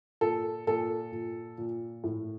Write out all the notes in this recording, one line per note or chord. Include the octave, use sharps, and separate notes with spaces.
A#2 A4
A#2 A4
A#2
A#2
A2